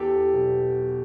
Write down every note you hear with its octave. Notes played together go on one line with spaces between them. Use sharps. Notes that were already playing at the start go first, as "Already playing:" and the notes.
Already playing: E2 G4 A4
B2 F#3